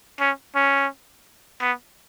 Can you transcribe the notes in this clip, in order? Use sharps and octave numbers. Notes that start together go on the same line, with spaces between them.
C#4
C#4
B3